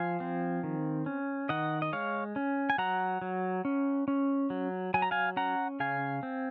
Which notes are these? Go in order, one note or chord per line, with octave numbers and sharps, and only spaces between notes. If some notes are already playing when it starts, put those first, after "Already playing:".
Already playing: F3 F5 G#5
C4
D#3
C#4
D#3 D#5 F#5
D#5
G#3 C#5 F5
C#4
G#5
F#3 F#5 A#5
F#3
C#4
C#4
F#3
F#3 G#5
A#5
F5 G#5
C#4 F#5 A#5
C#3 F5 G#5
C4